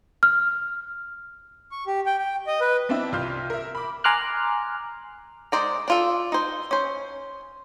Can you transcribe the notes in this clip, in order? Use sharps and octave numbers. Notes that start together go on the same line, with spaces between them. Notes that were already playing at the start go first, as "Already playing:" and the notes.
F6
C#6
G4
G5
G5
D#5
B4
B3 C4 D4 E4 E5
C2 F4 C6 F6 G6
A#4 E5
B5 D6
G#5 A#5 C6 D6 F6 F#6
G#3 C5 D5 A#5
D4 F4 A4
D#4 C5
C#4 C5